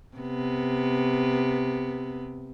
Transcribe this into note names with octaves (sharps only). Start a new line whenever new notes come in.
C3 B3